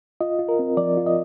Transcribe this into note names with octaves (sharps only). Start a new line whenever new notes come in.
F4 D#5
F4
A#4
C4
F3 D5
F4
D#5